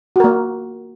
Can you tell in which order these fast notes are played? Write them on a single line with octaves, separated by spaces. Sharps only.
F#4 A#4 A#3